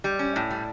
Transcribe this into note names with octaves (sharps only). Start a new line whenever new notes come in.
G3
C#4
A2
G3